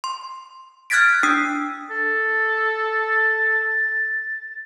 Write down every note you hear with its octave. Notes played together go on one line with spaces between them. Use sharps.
C6
F6 F#6 G#6 A6 B6 D7
D4 D#6 E6 C7
A4 A6